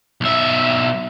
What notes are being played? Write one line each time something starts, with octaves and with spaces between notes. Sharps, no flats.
B1 E5